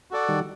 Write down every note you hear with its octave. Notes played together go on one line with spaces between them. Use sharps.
F#4 A4 D5 F#5
D#3 G3